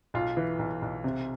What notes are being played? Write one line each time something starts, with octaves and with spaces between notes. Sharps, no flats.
B1 F4
E3
B1
B1
C3